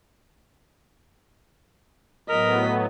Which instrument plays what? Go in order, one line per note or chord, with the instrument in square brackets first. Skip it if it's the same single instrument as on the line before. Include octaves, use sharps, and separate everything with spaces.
[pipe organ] A2 F#3 B3 [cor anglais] A#4 [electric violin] D#5 B6